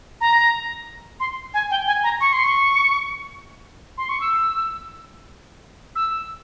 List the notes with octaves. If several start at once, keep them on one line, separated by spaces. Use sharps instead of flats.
A#5
C6
G#5
G5
G#5
A#5
C#6
C6
C#6
C6
C#6
E6
E6